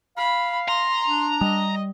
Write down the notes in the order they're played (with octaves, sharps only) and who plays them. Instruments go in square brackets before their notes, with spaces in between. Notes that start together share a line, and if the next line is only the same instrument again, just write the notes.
[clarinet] F5 [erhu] B5
[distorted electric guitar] A#5 [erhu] C6
[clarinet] D4
[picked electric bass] G3 [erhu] D#5